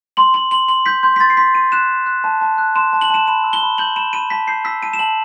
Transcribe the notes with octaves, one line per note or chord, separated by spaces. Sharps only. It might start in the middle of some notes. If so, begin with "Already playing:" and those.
C6 F#7
C6 F#7
C6 F#7
C6 F#7
G6 B6
C6 G6
B6
C6 A6
C7
C6 B6
C6 D#7
F#6 E7
C6
F#6
A5
A5
F#6
C6 E7
A5
F#7
A5 E7
B5 E7
E6
G7
B5
G6 F#7
B5 E7
B5 D#7
A5 B6
G6 C7
E6 B6
A5 D#7
E7
A5 F#7